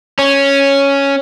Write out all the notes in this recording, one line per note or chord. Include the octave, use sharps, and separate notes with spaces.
C#4